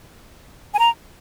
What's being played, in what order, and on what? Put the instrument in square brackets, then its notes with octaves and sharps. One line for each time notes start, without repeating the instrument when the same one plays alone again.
[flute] G#5
A#5